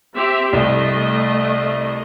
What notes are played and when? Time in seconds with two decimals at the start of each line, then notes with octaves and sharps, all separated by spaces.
0.15 C4 G4 E5
0.53 C2 A3 D#5